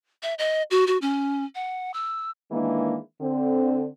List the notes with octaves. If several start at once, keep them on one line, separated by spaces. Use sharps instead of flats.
E5
D#5
F#4
F#4
C#4
F#5
E6
D#3 E3 G#3 A#3 D4
D3 C4